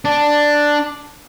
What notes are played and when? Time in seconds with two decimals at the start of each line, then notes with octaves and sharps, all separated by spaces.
0.05 D4